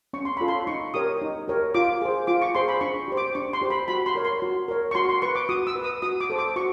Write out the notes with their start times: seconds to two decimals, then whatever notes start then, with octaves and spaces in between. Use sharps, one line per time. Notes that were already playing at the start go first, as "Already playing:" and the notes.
0.13 C#4 C#6
0.25 C6
0.37 F4 A4 C#5 B5
0.48 C6
0.67 D#4 C#6
0.94 G4 A#4 C#5 D#6
1.21 D#4
1.48 G4 A#4 C#5
1.74 F4 D6
2.02 G#4 C5
2.27 F4 D6
2.41 C#6
2.55 G#4 C5 C6
2.68 B5
2.81 D4 C#6
3.08 G4 C5
3.17 D6
3.35 D4 C#6
3.53 C6
3.62 G4 C5
3.70 B5
3.88 F#4 B5
4.06 C6
4.15 A#4 C#5
4.25 C6
4.42 F#4
4.68 A#4 C#5
4.91 C#6
4.95 F#4 C6
5.09 C6
5.22 B4 C#6
5.35 D6
5.49 F#4 D#6
5.67 E6
5.76 B4
5.84 D#6
6.02 F#4 D#6
6.20 D6
6.30 A4 C5
6.38 D6
6.56 F#4 C#6